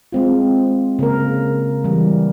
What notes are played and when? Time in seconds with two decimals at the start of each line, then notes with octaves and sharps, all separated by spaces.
0.12 G#3 C4 F4
0.99 C#3 A#3 A#4
1.84 E3 G3